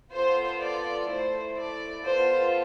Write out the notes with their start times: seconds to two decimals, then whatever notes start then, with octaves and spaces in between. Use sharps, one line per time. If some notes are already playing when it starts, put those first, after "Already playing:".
0.12 B3 F4 A4 C5
0.61 D5
1.09 A3 E4 A4 C5
1.57 D5
2.06 B3 F4 A4 C5